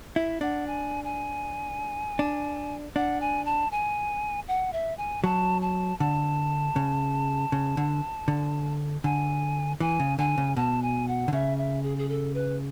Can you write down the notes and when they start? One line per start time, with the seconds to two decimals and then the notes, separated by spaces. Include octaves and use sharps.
0.15 E4 E5
0.41 D4 F#5
0.67 G#5
1.04 G#5
2.19 D4
2.96 D4 F#5
3.21 G#5
3.45 A5
3.72 G#5
4.48 F#5
4.73 E5
4.98 G#5
5.24 F#3 A5
5.62 A5
5.99 D3 A5
6.76 C#3
7.52 C#3
7.77 D3
8.28 D3
9.04 D3 G#5
9.80 E3 G#5
10.00 C#3
10.18 D3 G#5
10.38 C#3
10.57 B2 A5
10.83 G#5
11.08 F#5
11.28 D3
11.33 C#3 E5
11.58 E5
11.83 G#4
11.98 G#4
12.09 A4
12.34 B4